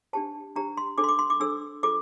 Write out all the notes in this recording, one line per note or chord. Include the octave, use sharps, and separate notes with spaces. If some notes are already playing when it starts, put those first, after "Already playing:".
D4 G4 C5 A5
D4 G4 C5 A#5
C6
D4 A4 C5 D6
C6
D6
C6
D6
D4 A4 C5 E6
F4 A4 C5 D6